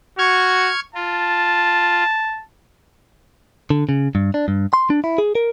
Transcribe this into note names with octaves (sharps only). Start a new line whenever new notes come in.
F#4 C#6 F6 G#6
F4 A5
D3
C#3
G2
D4
G2
C6
D4
E4
G#4
A#4